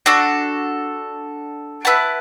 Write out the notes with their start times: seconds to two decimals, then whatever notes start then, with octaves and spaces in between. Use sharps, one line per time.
0.06 D4 F#4 A4
1.85 E4 B4 F#5 A5